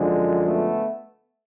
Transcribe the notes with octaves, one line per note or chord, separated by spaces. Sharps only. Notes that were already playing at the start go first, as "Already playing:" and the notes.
Already playing: F#2 D3 F3 G#3
A3 B3